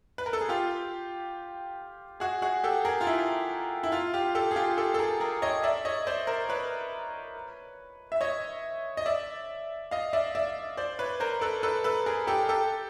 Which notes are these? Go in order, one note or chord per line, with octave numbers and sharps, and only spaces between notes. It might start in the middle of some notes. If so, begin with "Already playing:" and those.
B4
A#4
A4
G#4
F4 G4
F#4 G#4
F#4 G#4
G4 A4
G#4 A#4
F4
E4
E4
F4
F4 G4
G4 A4
G#4
F4 G4
G4 A4
A4
G#4 A#4
G#4 A#4
C#5 D#5
D5 E5
C#5 D#5
C5 D5
A#4 C5
B4 C#5
E5
C#5 D#5
D#5
D5 E5
D#5 F5
D5 E5
D5 E5
C5 D5
B4 C#5
A#4 C5
A4 B4
A4 B4
A4 B4
G#4 A#4
G4 A4
G4 A4